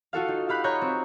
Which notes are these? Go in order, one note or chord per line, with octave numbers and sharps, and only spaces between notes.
F4 F#4 A4 F5
D#4
G4 F5 B5 F#6
C#5 D#5 A#5 C#6 F#6 G6
C4